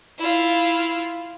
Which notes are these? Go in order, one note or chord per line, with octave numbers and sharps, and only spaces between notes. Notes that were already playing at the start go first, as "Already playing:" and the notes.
E4 F4